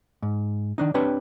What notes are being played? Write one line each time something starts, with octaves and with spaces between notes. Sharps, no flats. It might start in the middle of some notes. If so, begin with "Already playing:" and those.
G#2
D#3 D4 D#4
C4 D4 G4 B4 C#5